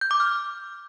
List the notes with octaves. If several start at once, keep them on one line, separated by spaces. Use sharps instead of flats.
G6
D6
F6